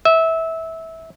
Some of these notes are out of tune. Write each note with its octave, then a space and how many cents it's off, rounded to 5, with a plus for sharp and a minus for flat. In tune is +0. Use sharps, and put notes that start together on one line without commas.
E5 -20